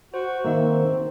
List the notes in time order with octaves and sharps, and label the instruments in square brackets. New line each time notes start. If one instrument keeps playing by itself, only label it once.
[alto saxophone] F#4 [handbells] C5
[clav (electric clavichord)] D#3 A#3 [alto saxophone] E5
[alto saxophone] C4